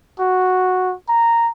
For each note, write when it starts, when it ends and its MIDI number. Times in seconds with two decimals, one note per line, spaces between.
0.20 0.95 66
1.09 1.50 82